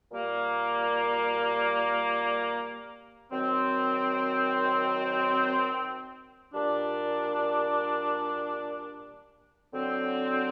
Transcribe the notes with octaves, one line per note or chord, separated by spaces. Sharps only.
A#2 G3 A#3
D#3 F#3 C4
A#2 G3 D4
D3 F#3 C4